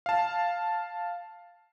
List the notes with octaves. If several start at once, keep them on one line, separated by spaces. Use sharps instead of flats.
F5 A5